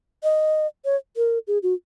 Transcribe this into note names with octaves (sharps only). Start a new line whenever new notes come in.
D#5
C#5
A#4
G#4
F#4